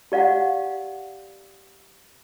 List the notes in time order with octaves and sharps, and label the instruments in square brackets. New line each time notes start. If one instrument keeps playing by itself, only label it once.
[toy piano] G4 D5 F5 F#5